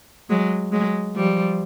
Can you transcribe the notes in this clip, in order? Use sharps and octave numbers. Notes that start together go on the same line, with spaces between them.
F#3 G#3
F#3 G#3
F3 G3